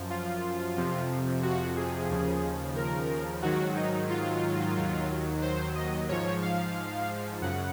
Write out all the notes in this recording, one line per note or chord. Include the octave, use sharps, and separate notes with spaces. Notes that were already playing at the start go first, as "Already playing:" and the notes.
Already playing: F#2 F3
F4
F2 C3 F3
F#4
G#4
D#2 C#3 F3
A#4
G#2 D#3 F#3 F#4
D#4
F4
D#2 D#3 F#3
C5
D#5
G#2 F3 C#5
F5
F#2 C#3 F#5